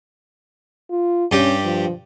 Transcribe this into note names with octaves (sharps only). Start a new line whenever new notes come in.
F4
G2 C#4 G4
F3